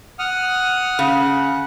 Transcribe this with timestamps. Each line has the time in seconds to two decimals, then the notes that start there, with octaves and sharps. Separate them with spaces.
0.19 F#5 D#6 F6
0.99 C#3 F#5